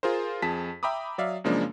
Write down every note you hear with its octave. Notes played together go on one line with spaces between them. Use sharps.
F4 G#4 A#4 C5
F2 G#4 A5 B6
E5 G5 A#5 B5 D6 D#6
F#3 D5 E5 F5
F#2 C#3 F3 G#3 A#3 D4